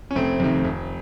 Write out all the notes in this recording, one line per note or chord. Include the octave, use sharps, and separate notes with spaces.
C#4
F1 A3 C4
F2 C3 D#3
F1